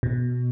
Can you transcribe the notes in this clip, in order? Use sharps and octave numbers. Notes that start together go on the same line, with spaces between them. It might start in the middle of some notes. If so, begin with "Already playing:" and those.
B2